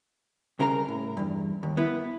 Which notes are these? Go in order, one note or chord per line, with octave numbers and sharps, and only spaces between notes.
C2 C#3 A#4 C5 A#5
A2
E2 G2
D#2
B3 E4 B4